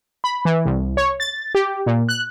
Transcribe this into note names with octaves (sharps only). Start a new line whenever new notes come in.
B5
E3
C2
C#5
A6
G4
A#2
F#6